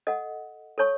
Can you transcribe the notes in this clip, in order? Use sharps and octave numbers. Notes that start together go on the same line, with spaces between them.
A4 D#5 F#5
A4 C#5 A5 C#6